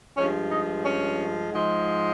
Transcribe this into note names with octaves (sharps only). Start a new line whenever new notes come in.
G2 F3 G#3 C#4
D#4
C#4
G#2 F3 G#3